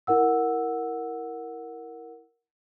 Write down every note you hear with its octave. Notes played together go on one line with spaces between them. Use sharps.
E4 A#4 F#5 E6